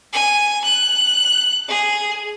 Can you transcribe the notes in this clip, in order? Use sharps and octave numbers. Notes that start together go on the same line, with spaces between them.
G#5
F#6
G#4